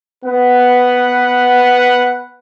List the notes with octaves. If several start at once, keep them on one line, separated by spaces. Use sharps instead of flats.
B3 B4 F#5